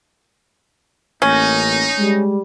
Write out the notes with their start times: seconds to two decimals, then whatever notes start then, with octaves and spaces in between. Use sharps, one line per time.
1.22 A1 A#3 C#4 D#4
1.98 G3 G#3